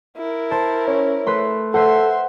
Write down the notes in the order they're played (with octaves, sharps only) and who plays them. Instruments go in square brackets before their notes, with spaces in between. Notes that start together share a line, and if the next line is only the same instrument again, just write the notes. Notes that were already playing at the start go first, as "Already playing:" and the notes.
[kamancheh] E4 A#4
[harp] C5 [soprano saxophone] A5
[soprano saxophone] C#4 [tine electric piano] C#5
[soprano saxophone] A3 [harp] B4 B5 C6
[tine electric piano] A4 [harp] B4 C5 F#5 [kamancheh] E5 C6